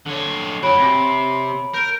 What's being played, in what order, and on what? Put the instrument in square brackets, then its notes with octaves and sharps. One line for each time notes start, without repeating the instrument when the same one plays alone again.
[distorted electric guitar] D3 C#5
[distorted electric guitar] F#4 G#5 [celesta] C#5 B5 D7
[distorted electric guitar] C3
[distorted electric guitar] A#4 [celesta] G6 D7